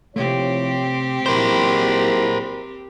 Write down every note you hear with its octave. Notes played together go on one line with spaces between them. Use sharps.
C3 F3 A3 C4 E4 G4 C#5
A#2 F#3 E4 A#4 C5 B5